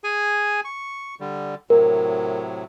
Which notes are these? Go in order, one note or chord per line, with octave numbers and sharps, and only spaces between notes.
G#4 G#5
C#6
D3 G3
A2 C3 F#3 A#4